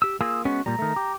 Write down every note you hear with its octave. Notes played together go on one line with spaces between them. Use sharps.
G4 E6
A#3 F4 G#4 E6
G#3 B3 C#4 F#4
A#2 G3 A#5
D#3 A3
G4